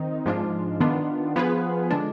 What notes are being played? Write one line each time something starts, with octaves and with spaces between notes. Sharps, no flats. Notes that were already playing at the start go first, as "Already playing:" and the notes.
Already playing: D#3 C4 D#4
G#2 F3 G#3 D4 F4
D#3 B3 D4 F4
F3 B3 F4 G#4 B4
D3 G#3 D4